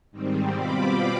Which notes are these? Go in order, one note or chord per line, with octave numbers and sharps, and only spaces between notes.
G#2 D#3 G3 C4
B2 G3 C4 F4 B5 D6